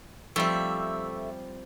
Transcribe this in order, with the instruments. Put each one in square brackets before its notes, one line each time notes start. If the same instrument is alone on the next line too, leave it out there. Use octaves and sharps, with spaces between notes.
[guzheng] F3 G3 C4 [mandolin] A3 E5